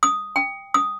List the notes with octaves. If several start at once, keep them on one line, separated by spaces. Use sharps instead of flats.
D#6
G5
D#6